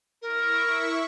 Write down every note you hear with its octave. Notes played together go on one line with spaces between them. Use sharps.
E4 A#4 E5 C#6